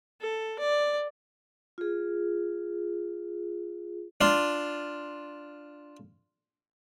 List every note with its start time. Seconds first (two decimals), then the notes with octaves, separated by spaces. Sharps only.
0.21 A4
0.59 D5
1.78 F4 G#4
4.21 D4 F4